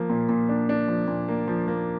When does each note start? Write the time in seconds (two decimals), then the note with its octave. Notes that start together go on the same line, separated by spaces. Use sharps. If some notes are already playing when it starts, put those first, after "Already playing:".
Already playing: F3 A#3
0.10 A#2
0.29 A#2
0.49 D4
0.69 D4
0.88 F3
1.08 A#2
1.28 A#3
1.48 F3
1.68 A#3